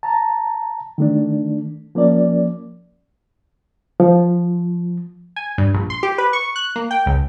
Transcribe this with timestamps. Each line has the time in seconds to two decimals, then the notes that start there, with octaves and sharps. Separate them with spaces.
0.03 A5 A#5
0.98 D#3 A3 D4
1.95 F3 A#3 C#4 D5
4.00 F3
5.36 G#5
5.58 G2
5.74 A#1
5.90 C6
6.03 G4
6.18 B4
6.33 C#6
6.56 F#6
6.76 A#3
6.91 G5
7.06 C#2